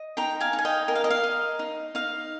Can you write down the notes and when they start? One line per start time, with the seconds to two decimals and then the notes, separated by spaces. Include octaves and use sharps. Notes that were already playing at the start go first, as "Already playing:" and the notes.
Already playing: D#5
0.17 D#4 G5 A#5
0.40 F5 G#5
0.53 D#4
0.59 G#5
0.65 D#5 G5
0.88 A#4 G5
0.95 F5
1.04 D#5
1.10 F5
1.24 D#5
1.59 D#4
1.95 D#4 F5